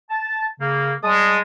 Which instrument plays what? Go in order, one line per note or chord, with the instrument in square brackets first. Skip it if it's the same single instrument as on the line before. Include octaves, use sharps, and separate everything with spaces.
[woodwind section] A5
C#3 A#3
[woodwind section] G3 A5 D#6 [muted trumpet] G#3